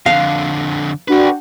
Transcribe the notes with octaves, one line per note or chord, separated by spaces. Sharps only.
F2 D3 F5
D4 F#4 A4 B4 G5